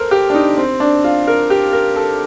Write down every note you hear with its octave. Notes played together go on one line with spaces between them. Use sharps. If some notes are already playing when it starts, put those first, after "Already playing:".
Already playing: A4 A#4 C5
G4
D4
D#4
C4
D4
F4
A#4
G4
A#4
A4